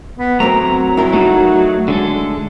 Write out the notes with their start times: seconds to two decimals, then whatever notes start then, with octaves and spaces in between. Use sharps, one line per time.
0.18 B3
0.40 F#3 A3 C4 A#4 A#5
0.97 E4 A#4
1.14 A3 D#4 F#4
1.88 D3 G#3 A4